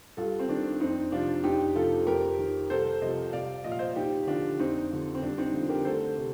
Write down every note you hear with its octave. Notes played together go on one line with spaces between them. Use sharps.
G2 F4 A4
C4
D#3 D4
F2 C4 D#4
C3 F3 D4 F4
F2 D#4 G4
C3 F3 F4 A4
F2 G4 A#4
D#3
C2 A4 C5
C3 F3 C5 D#5
C2 D5 F5
A#2 F3 D#5
F5
C5 D#5
D#2 D#4 G4
D3 F3 D4 F4
F2 C4 D#4
D3 F3
C4
G2 D4
C4 D#4
D3 F3
G4 A#4
D2 A4 C5
C3